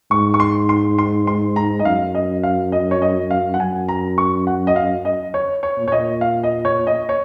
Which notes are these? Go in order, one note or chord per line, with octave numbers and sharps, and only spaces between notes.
G#2 C#6
C#6
C6
C6
C6
C6
A#5
D#5
F#2 F5
D#5
F5
D#5
C#5
D#5
F5
F#5
F#2 G#5
A#5
C#6
F#5
D#5
F5
D#5
C#5
C#5
A#2
C#5
D#5
F5
D#5
C#5
D#5
C#5